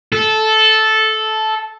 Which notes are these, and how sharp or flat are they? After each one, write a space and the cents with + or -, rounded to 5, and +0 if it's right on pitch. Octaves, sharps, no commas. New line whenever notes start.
A4 -10